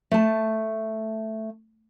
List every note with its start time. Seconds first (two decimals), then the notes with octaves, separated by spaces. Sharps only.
0.11 A3 A5